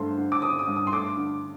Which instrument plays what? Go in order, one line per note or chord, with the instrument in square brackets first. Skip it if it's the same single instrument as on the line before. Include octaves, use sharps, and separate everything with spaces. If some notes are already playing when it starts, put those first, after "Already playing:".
Already playing: [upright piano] G2 D3 A3 C4 C5 C6
D3
D6
C4 D#6
D#6
G2
D#6
C6
A3 D6
D3